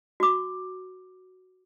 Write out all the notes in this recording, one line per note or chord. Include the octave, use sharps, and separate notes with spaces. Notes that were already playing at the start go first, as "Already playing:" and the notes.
F#4 D6